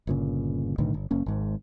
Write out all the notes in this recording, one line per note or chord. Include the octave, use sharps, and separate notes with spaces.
G1 A#2 C#3
B1 A2 D3 D#3
G1
F#1 A#3 C#4
G#1 G#2